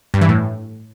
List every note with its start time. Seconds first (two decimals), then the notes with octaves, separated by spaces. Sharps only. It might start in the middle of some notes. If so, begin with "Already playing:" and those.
0.14 G2
0.21 E3
0.29 A2